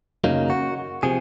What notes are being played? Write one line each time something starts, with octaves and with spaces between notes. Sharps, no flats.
F#2 C#3 F#3 A#3 D#4
F#4
C3 F3 G#4